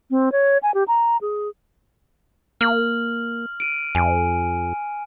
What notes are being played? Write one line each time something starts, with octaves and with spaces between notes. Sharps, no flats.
C4
C#5
G#5
G4
A#5
G#4
A#3 F6 F#7
D7 D#7
F2 G#5